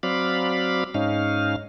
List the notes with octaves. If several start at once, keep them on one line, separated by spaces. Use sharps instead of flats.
F#3 C4 D5 F5 B5
G#2 C#4 D#4 F5